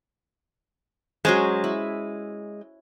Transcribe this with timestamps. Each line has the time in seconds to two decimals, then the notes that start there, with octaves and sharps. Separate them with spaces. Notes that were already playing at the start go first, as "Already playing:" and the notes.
1.25 F#3 G#3 C#4 C5
1.64 E4